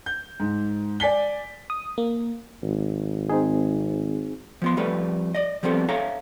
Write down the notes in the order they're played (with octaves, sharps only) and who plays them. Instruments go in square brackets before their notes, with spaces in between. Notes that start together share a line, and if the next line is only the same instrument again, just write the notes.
[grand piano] G6
G#2
D5 G#5 B6 G7
[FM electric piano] D#6
A#3
[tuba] G#1
[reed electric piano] C4 D#4 G#4
[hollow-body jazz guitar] F3 B3 C6
F2 G3 A3 B4
D5 D#5
F3 G3 B3 C4 A4
A4 C#5 E5 F5 A#5